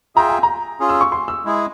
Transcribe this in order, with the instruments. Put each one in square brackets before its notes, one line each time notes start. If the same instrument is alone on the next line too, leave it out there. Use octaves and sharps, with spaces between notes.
[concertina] F4 G#4 E5 G5 [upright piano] A#5
[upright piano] G#5
A#5
[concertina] C#4 F4 G#4
[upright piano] E6
C#6
C6
E6
[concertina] G#3 E4 G#4